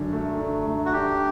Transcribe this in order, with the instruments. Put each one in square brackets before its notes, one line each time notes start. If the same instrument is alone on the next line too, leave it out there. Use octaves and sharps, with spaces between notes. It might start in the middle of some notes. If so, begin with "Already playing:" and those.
Already playing: [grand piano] F#2 D3 D4
A3
D4
A3
[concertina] F#4
[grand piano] D4 [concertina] G4